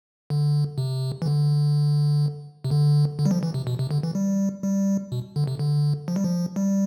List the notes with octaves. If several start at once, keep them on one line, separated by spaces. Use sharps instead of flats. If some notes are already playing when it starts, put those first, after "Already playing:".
D3
C3
E3
D3
C3
D3
D3
G3
F3
E3
C3
B2
C3
D3
E3
G3
G3
B2
D3
C3
D3
F3
G3
F3
G3